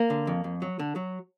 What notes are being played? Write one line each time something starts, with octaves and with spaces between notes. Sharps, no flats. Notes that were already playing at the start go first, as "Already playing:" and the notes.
Already playing: A#3
D3
F2
F2
F#3
D3
F#3